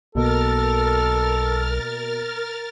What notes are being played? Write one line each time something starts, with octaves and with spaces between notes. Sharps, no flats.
B1 B2 A#3 A4 A#4 F6 A6